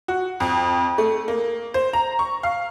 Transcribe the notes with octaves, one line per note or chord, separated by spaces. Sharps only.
F#4
F2
A3
A#3
C5
A#5
C#6
F5